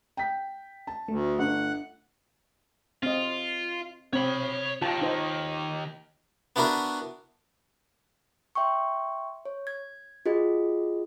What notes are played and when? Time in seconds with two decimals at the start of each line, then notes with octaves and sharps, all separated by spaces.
0.17 G5 B6
0.87 A5
1.08 D2 A3
1.39 G1 F#5
3.03 C4 F4 D#5
4.13 C4 C#5 B5
4.82 D#2 D#3 F4 A5
5.02 D#4 C5
6.56 B3 D4 E4 F#4 A#4
8.55 E5 G5 C6 C#6
9.45 C#5
9.67 G#6
10.26 F4 F#4 G#4 D#5